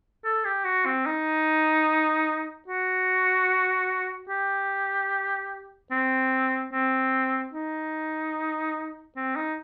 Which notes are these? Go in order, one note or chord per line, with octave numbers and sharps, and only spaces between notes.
A4
G4
F#4
C4
D#4
F#4
G4
C4
C4
D#4
C4
D#4